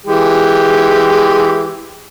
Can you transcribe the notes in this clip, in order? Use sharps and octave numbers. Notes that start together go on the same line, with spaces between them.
E3 G#3 G4